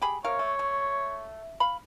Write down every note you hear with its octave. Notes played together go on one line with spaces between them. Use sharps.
G4 G#4 B5
C3 A#4 C#5 F5
A3
A3
F5 B5